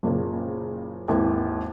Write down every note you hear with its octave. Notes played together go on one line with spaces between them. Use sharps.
F#1 A#2 C#3
G#1 D#2 E3